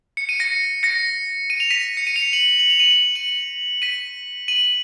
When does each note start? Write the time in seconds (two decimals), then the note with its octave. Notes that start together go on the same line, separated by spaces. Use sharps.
0.17 C#7
0.29 D#7
0.40 A#6 C#7
0.83 A#6 C#7
1.50 D#7
1.60 F7
1.70 B6 D#7
1.97 C#7
2.07 D#7
2.16 C#7 F7
2.33 D#7 F#7
2.59 F#7
2.70 F7
2.79 D#7 F#7
3.15 D#7 F#7
3.82 B6 D#7
4.48 D#7 F#7